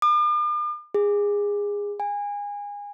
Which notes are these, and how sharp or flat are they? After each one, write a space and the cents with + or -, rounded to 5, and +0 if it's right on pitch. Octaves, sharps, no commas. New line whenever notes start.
D6 +45
G#4 -20
G#5 -25